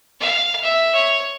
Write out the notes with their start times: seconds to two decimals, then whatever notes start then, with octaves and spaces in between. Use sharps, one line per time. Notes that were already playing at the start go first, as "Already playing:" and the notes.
0.20 F5
0.63 E5
0.94 C#5